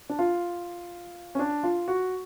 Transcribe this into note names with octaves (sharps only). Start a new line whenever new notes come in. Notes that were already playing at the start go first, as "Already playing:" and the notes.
D4
F4
C#4
D4
F4
F#4